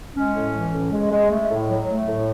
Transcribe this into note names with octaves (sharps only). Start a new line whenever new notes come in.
G#3 C#4
A2
E3
A2
G#3
G#3
A3
A2
F#3
A3
A2